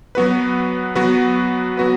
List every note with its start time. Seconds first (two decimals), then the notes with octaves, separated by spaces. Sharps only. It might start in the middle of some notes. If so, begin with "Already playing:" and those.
0.15 F#3 B3 F#4 B4
0.96 F#3 B3 F#4 B4
1.77 F#3 B3 F#4 B4